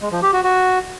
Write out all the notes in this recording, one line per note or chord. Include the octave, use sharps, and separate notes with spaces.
G#3
F3
G4
F#4
F#4